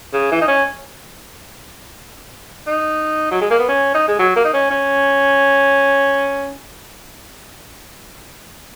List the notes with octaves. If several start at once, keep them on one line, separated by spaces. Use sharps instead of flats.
C#3
E3
D#4
C#4
D#4
F#3
G#3
A#3
B3
C#4
D#4
G#3
F#3
A#3
D#4
C#4
C#4